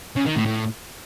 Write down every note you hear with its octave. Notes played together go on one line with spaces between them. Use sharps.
C#3
D#3
A2
A2